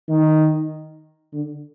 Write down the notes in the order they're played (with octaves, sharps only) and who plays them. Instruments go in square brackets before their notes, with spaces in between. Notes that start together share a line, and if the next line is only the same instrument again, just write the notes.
[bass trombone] D#3
D3